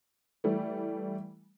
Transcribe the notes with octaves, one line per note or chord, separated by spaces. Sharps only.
E3 G3 A3